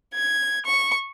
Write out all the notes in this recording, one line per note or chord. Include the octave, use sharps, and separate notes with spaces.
G#6
C#6